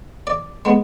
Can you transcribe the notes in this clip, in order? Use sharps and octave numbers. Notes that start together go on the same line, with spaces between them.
D5
G#3 B3